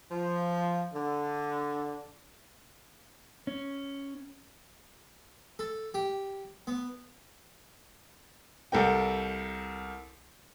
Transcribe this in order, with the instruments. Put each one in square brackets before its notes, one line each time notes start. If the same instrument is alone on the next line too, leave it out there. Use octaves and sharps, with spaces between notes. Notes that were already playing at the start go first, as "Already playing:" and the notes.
[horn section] F3
D3
[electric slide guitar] C#4
[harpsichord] A4
G4
B3
[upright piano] C2 A4 A#4 G5